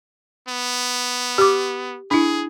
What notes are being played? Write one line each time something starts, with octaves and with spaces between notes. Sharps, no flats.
B3
G4 D6
D4 E4 G#4